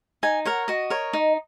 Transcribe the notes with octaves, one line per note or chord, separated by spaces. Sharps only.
D#4 G#5
A#4 C#5 F#5
F#4 D#5
A#4 C#5
D#4